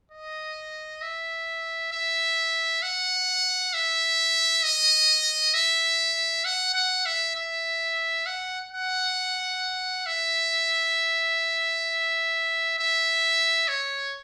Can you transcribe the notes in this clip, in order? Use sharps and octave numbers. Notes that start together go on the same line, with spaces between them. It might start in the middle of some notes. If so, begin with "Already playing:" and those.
D#5
E5
E5
F#5
E5
D#5
E5
F#5
F#5
E5
E5
F#5
F#5
E5
E5
C#5